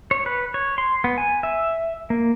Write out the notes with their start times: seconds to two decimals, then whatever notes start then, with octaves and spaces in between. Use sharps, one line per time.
0.11 C#5
0.26 B4
0.54 C#5
0.78 C6
1.04 B3
1.18 G#5
1.43 E5
2.10 A#3